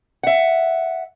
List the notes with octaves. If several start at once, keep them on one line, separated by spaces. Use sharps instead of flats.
E5 F#5